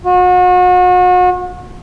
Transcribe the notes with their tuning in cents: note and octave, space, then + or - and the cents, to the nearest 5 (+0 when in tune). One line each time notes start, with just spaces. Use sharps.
F#4 -35